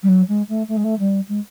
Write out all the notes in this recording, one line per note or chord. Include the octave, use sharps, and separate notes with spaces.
G3
F#3
G#3
A3
A3
G#3
A3
G3
G#3